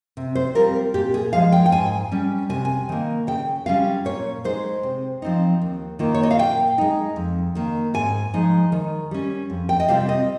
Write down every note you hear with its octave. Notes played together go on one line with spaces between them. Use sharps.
C3
C5
G3 C4 F4 A#4
A#2 G4
G#4
F3 G#3 F5
G5
G5
G#2 G#5
G3 C#4
C3 G#5
G#5
D#3 A#3
C#3 G5
G3 C#4 F4 F5
A#2 C#5
G#3 D#4 C5
C3
F3 C4 D#4
D#2
D#3 A#3 F4
C#5
D#5
F5
A#2 G5
G#3 D#4
F2
D#3 A#3
G#2 G#5
F3 G#3 D#4
D#3
G3 C#4
F2
G5
D#5
C3 G3 C4 F4 F5
D#5